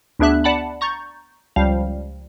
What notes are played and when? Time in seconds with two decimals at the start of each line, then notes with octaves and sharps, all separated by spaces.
0.19 D2 B3 D4 G#4 E5 F#6
0.44 D5 F#5 A5 B5
0.81 A#5 C#6 G6 A6
1.56 C#2 F3 G3 F5